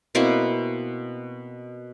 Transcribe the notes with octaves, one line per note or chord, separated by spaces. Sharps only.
B2 A#3 C4 E4